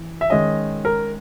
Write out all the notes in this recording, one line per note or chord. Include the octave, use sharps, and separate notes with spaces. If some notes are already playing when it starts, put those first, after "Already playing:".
Already playing: E3
E5
D#3 G#3 C#4 D#5
A#4